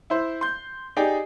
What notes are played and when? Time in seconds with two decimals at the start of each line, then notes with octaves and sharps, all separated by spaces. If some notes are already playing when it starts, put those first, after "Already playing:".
0.10 E4 C5
0.41 C6 G6
0.96 D#4 G4 G#4 D5 D#5 G5